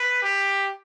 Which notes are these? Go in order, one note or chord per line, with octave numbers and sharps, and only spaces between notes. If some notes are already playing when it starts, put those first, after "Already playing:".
Already playing: B4
G4